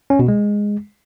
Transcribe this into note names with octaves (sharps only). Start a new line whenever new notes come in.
C#4
B2
G#3